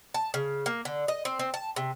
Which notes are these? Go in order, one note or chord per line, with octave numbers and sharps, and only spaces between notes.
A5
C#3
A#3
D3
D#5
C4
C4
A5
C3